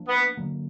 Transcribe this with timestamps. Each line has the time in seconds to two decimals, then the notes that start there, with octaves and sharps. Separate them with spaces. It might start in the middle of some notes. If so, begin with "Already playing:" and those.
Already playing: F3 A#3 D4
0.08 B3
0.37 D3 F#3 A#3